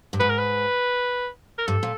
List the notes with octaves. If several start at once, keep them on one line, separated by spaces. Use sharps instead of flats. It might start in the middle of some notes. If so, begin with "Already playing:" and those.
G2
G#2 B4
A#4
B4
A#4
G2 A4
A#2